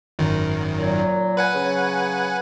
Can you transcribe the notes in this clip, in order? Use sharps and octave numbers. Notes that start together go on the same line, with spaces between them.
G#1 F#2 D#3
A#2 F#3
B4 F#5 G#5
C#3 F#3